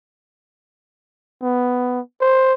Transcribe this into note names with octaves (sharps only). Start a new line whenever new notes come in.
B3
C5